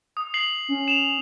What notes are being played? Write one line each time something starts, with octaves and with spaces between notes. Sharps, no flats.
D#6
C7 F#7
C#4
E7 F7